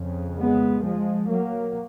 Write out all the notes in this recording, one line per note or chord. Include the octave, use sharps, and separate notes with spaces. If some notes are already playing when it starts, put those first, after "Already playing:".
Already playing: F2 C#3
G#3 B3
F3 G#3
F#3 A#3